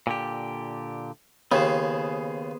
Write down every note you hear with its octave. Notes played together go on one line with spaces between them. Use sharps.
A#2 D3 G4
D#2 C#3 B3 G#4 C5